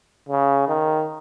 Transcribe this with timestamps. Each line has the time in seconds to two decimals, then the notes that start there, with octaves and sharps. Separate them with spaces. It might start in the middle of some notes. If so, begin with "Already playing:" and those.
0.29 C#3
0.68 D#3